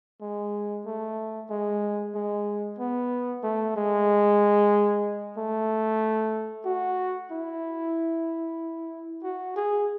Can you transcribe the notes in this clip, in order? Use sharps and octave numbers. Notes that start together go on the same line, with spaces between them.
G#3
A3
G#3
G#3
B3
A3
G#3
A3
F#4
E4
F#4
G#4